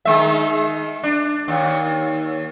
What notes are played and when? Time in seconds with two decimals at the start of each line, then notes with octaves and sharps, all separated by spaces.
0.05 D#3 G#3 E5
1.03 D4
1.48 D#2